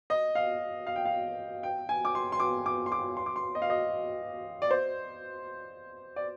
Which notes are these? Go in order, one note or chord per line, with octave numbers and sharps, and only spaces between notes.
D#5
F5
F5
G5
F5
G5
G#5
D6
C6
C6
D6
D6
C6
D6
C6
D6
C6
D#5
F5
D#5
D5
C5
D5